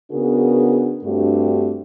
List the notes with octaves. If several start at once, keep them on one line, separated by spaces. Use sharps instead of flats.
C#3 B3 D4 F#4 G#4 A#4
G2 A3 C4 D4 F#4 G4